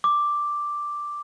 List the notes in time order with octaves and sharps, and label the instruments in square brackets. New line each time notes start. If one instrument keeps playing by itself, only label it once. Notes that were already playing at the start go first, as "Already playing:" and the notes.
[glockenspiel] D6